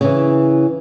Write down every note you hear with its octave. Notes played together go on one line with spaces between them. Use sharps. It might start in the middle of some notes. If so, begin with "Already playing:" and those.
C#3 E3